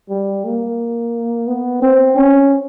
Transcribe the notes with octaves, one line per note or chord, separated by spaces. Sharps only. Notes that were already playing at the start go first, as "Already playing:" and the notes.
G3
A#3
B3
C4
C#4